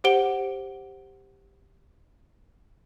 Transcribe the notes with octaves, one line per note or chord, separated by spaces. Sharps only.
G4 C5 F#5 D7 G7